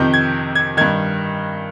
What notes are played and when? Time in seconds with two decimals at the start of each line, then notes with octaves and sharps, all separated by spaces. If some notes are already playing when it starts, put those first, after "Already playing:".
Already playing: F2 C3 D#3 G6
0.14 G#6
0.55 G#6
0.77 G2 D#3 G#6